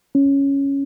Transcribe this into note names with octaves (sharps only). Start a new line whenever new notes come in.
C#4